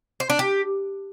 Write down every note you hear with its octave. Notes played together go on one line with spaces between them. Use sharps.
C5
D4
G4